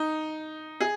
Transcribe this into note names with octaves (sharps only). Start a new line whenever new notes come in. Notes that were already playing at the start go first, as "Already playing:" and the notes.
Already playing: D#4
G#4